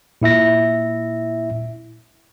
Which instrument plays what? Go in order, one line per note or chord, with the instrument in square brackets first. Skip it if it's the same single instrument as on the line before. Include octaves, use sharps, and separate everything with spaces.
[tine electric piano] A#2 E4 E5 A#6